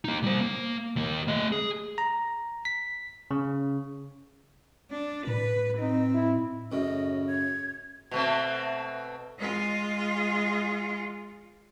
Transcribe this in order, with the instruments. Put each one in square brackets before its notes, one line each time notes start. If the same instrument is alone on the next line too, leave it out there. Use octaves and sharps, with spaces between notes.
[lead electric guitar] A#3 D#4
G3 C5
A#3
D#2 A#3
A3 D#5
G#4
[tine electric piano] A#5
B6
C#3
[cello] D4
[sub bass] A2 [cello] B4
[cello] C4 [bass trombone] D#4
[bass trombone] E4
[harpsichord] F#2 A2 [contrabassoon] C#3 [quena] D#5
[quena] G#6
[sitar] B2 A3 C4
[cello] G#3 F4